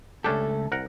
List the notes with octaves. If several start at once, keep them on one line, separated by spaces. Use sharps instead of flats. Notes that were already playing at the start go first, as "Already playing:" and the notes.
C#2 A3 C#4 D4 G4 A4
C2 A#4 F#5